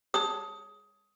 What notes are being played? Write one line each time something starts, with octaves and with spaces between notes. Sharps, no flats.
G#4 C#5 A5 D#6